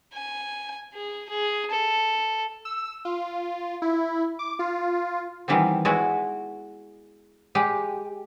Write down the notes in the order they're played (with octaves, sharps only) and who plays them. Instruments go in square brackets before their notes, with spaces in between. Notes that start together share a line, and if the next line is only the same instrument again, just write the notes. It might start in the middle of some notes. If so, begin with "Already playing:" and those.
[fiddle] G#5
G#4
G#4
A4
[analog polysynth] E6
F4
E4
D6
F4
[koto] D#3 E3 G3 B3 C4
G#3 B3 E4 F#4
G#3 G4